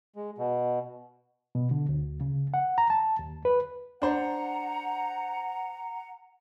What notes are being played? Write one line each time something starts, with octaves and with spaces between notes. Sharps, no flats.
G#3
B2
B2
D3
D2
C#3
F#5
A#5
A5
D#2
B4
D4 C5 F#5 A#5